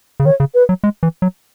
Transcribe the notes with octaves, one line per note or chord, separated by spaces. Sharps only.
C#3
D#3 C#5
C#3
B4
F#3
G#3
E3
F#3